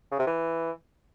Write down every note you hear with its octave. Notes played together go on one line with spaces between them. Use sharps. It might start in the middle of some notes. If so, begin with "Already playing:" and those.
C#3
C3
E3